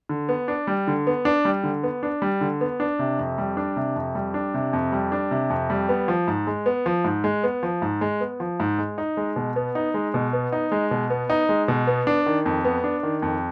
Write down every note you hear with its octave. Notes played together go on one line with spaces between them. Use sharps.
D3
B3
D4
G3
D3
B3
D4
G3
D3
B3
D4
G3
D3
B3
D4
C3
F2
G3
D4
C3
F2
G3
D4
C3
F2
G3
D4
C3
F2
G3
B3
F3
G#2
G#3
B3
F3
G#2
G#3
B3
F3
G#2
G#3
B3
F3
G#2
G#3
D#4
G#3
B2
B3
D#4
G#3
B2
B3
D#4
G#3
B2
B3
D#4
G#3
B2
B3
D4
D#3
F2
B3
D4
D#3
F2